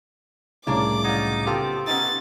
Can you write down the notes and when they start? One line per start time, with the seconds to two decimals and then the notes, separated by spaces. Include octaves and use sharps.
0.67 C2 A2 C#3 A#3 D4 C#5 D5 D6
1.04 F#3 D#4 F4
1.47 B3 C4 F4 G4 A4
1.87 B3 C#4 D#4 A6